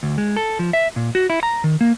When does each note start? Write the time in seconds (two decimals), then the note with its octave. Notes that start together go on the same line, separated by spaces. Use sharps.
0.03 D2
0.18 G#3
0.37 A4
0.59 F3
0.73 E5
0.96 A#2
1.15 F#4
1.30 E4
1.43 A#5
1.64 D#3
1.81 A#3